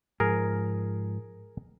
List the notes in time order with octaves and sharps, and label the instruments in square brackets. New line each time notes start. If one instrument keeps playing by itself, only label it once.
[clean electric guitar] G#2 F3 [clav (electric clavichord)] G#4 A#4